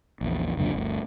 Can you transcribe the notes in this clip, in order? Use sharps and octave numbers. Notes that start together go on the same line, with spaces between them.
A#1 E2
C#2 F#2 A#2 D3
G1 D2